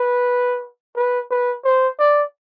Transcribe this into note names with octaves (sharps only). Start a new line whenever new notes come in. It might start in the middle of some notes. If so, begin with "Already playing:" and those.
Already playing: B4
B4
B4
C5
D5